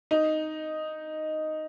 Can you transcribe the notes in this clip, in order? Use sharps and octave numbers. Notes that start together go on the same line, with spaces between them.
D#4